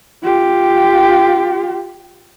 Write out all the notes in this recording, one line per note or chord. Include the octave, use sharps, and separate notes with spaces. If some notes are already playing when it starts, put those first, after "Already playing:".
F4 G4